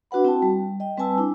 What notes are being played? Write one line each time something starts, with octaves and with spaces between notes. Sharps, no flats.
D4 F#4 B4 F#5 B5
C4 E4 F#4 G5 A5
G3
D#5 G5
G3 C4 B4 G#5 A5 E6
D4 E4